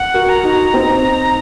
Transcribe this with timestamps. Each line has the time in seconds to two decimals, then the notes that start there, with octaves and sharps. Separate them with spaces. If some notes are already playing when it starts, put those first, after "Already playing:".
Already playing: F#5
0.14 F#4 A#4
0.29 A#5
0.44 D#4 F#4
0.74 C4 D#4